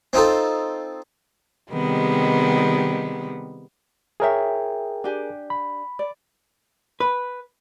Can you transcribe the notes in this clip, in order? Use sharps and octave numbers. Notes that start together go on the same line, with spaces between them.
C4 D#4 F4 A4
C3 D#3 G3 G#3 B3
E4 G#4 A#4 C#5 E5 G5
D4 G4 G#5
B5
D5
B4